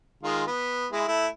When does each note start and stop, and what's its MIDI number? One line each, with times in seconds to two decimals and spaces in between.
0.23 0.45 51
0.23 0.45 56
0.23 0.45 65
0.47 0.86 59
0.92 1.06 56
0.92 1.06 64
1.08 1.27 57
1.08 1.27 64